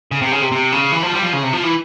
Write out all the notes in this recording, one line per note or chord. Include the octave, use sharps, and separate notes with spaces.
C#3
C3
C#3
C3
C3
C#3
E3
F3
G3
F3
C#3
C3
F3
E3